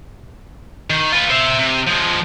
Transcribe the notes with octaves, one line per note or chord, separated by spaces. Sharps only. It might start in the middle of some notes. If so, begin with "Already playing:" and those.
D#3
F4 B4
C5 E5
C3
F3 G#3